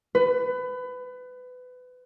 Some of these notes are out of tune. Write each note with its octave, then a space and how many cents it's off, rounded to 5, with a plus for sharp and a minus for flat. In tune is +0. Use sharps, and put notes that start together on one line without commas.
B4 +25